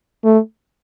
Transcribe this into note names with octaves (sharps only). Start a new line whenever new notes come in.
A3